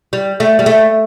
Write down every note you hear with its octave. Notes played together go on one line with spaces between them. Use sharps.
G3
A3
G3
A3